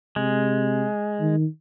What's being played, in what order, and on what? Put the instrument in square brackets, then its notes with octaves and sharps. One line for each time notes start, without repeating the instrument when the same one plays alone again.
[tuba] C3 [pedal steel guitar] G#3
[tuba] D#3